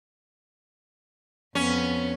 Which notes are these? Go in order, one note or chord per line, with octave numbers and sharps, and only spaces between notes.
F2 B3 C#4